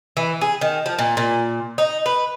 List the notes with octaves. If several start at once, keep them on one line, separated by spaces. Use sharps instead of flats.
E3
G#4
D#3
F3
A#2
A#2
D#4
B4